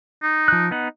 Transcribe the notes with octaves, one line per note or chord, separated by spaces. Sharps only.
D#4
F3 F#6
B3 D#4 F#5